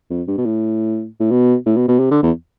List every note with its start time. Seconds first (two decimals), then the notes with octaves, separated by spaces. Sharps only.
0.10 F2
0.27 G2
0.37 B2
0.45 A2
1.20 A2
1.31 B2
1.65 A2
1.76 B2
1.88 B2
1.99 C3
2.11 D3
2.23 E2